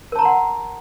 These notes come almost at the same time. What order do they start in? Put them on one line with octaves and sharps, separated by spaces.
A#4 A5 A#5 C6 F#5